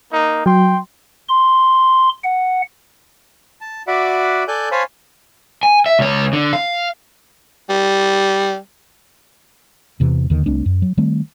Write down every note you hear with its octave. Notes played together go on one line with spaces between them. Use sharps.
A#3 D#4
F#3 G5 C6
C6
F#5
A5
F#4 D5 E5 F#5 B5 D6
A4 D5 G#5 F#6 G6
C5 C#5 F5 G#5 A5 B5
G#5
E5
C#2 C#5
D3
F5
G3
E2 C3 E3
D#2 D3 D#3
C2 A3 C4 D4
F#2
F#3
D#3 G3 A3 C4